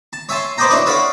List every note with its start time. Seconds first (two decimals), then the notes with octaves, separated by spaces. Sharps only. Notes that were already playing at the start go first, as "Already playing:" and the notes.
0.13 A5
0.29 C#5 E5 G#5 A5 C6
0.58 B4 C5 D5 D#5 G5 A#5
0.70 D4 E4 F#4 B4 C#5 D#5
0.86 A4 B4 C#5 D5 F5 F#5